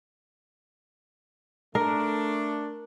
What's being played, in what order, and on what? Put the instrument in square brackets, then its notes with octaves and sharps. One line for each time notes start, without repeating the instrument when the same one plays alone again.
[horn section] A3 D4 [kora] A#4